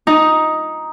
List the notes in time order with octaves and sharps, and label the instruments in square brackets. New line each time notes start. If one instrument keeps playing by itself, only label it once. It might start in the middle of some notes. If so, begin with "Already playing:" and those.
[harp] D#4